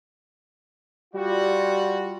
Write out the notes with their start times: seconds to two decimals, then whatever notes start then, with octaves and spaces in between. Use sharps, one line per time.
1.14 G3 F4 F#4